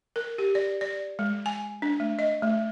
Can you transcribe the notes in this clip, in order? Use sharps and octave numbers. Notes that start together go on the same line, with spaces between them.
A#4
G4
D5
D5
G#3
G#5
D4
A3
D#5
A3